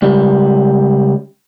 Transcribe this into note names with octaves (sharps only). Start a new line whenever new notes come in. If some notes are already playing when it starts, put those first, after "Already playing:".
C#2 G3